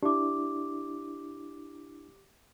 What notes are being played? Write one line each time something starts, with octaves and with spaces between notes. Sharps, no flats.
D4 E4 G4 D6